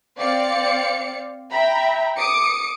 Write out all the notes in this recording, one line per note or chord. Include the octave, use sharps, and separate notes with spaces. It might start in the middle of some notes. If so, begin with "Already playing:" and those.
C4 D5 F5 C#7
E5 G5 A#5 B5
D6 D#6 C#7 D7